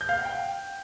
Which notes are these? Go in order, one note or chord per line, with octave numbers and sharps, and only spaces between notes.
G6
F5
F#5
G5